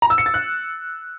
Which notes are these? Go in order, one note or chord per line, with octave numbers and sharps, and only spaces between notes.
A#5
E6
C#7
A6
F#6